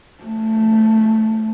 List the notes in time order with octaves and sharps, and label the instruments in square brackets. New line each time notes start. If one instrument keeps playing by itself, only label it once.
[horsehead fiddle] A3